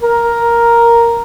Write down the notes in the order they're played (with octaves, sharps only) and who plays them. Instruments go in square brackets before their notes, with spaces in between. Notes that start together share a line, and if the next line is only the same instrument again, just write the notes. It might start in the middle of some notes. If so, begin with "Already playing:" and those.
[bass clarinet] A#4